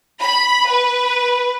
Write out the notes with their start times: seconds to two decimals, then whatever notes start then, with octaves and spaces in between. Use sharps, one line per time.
0.21 B5
0.68 B4